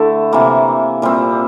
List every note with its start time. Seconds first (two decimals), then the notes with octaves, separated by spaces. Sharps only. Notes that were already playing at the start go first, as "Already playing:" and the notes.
Already playing: D3 A3 E4 A4
0.33 C3 E3 A#3
1.02 A#2 G3 C4